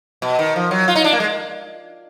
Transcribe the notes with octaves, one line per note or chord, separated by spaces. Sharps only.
B2
D#3
F3
F#3
F4
D#4
D4
A#3
G#3